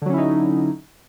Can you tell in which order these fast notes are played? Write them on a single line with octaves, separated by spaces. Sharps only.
D3 F#3 C#4 E4 D#4